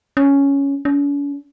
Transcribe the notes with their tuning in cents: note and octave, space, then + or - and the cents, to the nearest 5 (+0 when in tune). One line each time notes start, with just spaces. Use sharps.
C#4 +5
C#4 +45